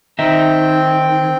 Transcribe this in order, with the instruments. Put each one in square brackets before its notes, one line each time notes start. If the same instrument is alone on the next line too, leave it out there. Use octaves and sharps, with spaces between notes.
[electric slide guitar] D#3 [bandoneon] C4 G5 [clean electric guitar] D#4 D#5 E5